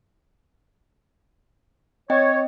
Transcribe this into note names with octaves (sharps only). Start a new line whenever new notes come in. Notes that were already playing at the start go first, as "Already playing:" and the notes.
C4 C#5 D#5 G5